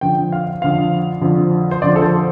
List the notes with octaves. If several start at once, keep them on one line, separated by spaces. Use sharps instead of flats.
F2 D3 F3 G5
F5
F2 D3 F3 F5
F2 D3 F3
C5
F2 D3 F3 D5
A4
C5